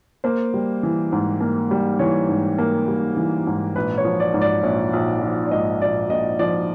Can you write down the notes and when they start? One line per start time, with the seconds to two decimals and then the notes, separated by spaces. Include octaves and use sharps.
0.24 A#3 C5
0.54 G3
0.83 E3
1.12 G#2
1.41 A#3
1.71 G3
1.99 E3 C#5
2.29 G#2
2.58 A#3
2.88 G3
3.17 E3
3.47 G#2
3.76 A#1 B4
3.98 C#5
4.05 F3
4.20 D5
4.34 G#2
4.41 D5
4.63 A#1 C#5
4.93 A#1
5.22 F3
5.46 D5
5.51 G#2 D#5
5.82 A#1 D5
6.10 A#1 D#5
6.39 F3 D5